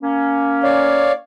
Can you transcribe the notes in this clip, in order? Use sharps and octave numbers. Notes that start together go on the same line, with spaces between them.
A#3 C#4
C#5 D5 F5